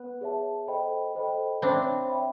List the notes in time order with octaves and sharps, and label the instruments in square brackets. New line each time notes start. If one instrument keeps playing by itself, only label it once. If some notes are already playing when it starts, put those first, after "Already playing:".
Already playing: [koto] B3
[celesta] G#4 C#5 E5 A5
A4 C5 D#5 G5 B5
A4 C5 D#5 G5 B5
[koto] C4 D4 [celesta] C#5 E5 G5 B5
[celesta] C#5 E5 G5 B5